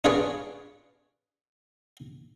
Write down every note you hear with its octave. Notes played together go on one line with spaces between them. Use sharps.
D4 F4 G#4 B4 C#5 D5